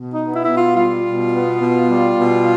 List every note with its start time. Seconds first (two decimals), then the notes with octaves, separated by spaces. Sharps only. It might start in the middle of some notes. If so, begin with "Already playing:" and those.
Already playing: B2
0.12 D#4
0.19 B3
0.34 E4
0.44 B2 E4
0.55 F4
0.75 G3 F4
1.04 B2
1.32 B3
1.60 B2
1.88 G3
2.16 B2